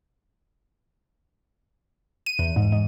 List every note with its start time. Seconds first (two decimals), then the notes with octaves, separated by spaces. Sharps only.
2.26 D#7
2.39 E2
2.56 G#2
2.72 G#2